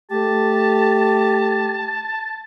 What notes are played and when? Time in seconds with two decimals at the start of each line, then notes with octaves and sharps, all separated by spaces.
0.11 A3 G4 A5